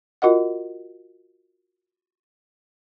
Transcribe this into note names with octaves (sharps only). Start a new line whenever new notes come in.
F4 F#4 A#4 D#5 F#5